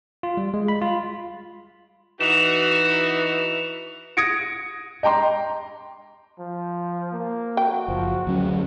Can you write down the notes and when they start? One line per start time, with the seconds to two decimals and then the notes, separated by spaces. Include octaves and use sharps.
0.23 F4
0.37 G3
0.54 G#3
0.68 B5
0.82 F4
2.21 E3 D#4 F#4 E7 F7
4.17 D#6 G#6 A#6 C#7 D7
5.03 D#5 G5 A#5 C6
6.40 F3
7.13 A#3
7.57 F#4 G5
7.88 F#1 F3
8.27 D2 C#3 F#3 C#4